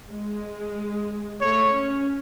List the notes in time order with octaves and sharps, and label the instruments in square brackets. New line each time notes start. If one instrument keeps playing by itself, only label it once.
[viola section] G#3
[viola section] A3 [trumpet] C#5
[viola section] C#4